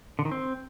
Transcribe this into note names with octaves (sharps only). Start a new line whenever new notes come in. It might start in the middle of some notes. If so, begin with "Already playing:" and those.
D3
D#3
C4